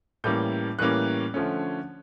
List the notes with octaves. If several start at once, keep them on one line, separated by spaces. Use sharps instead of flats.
A2 E3 G3 A#3 C#4 G6
A2 E3 G3 A#3 C#4 F#6
D3 F3 A3 C#4